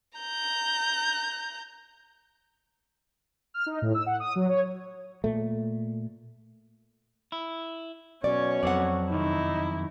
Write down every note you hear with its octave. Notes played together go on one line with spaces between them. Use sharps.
A#5 G6
F6
D#4
A2
E6
F#5
D#6
F#3
C#5
A#2 A3
E4
B1 B2 C#4 C#5 D5
F2 F#3 C4 D5 F#5
F#2 C3 D#3 D#4 E4